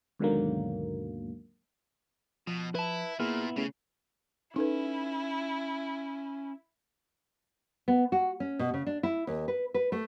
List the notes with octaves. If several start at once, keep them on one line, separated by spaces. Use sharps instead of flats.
D#2 G#2 B2 D3 F#3 A#3
B2 F3
E4 B4 A5
A#2 A#3 B3 E4 G#4 F6
C#3 A3 C#4 G#4
C#4 D#4 E4 A4 B4
B3
F#4
C#4
B2
C#3
D4
E4
D#2
B4
B4
A3